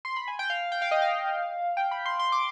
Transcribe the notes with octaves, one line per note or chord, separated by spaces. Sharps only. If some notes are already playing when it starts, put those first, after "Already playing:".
C6
B5
G#5
G5
F5
G5
F5
D#5
F5
G5
B5
C6
C6
D6